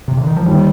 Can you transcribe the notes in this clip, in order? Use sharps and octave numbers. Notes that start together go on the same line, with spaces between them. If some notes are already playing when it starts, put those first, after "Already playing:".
C3
D3
D#3
F3
D#2 G3